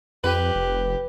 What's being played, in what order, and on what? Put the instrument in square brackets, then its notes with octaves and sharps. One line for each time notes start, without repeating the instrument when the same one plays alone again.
[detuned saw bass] F2 [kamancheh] G4 [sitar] B4
[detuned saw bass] F1